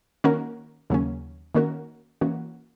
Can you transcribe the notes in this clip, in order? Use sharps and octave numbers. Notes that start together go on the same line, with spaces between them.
D#3 A#3 C#4 F#4 A#4
D#2 C#3 F#3 A#3 C#4
D#3 A#3 C#4 F#4 A#4
E3 A#3 C#4 F#4